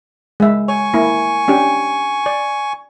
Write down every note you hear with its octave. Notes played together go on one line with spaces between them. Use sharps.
G#3 E5
C#5 G#5 C#6
A#3 E4
C#4 D4 G4
D5